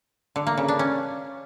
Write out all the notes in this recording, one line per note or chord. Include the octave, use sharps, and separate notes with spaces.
D3
A#3
C#3
D4
C#4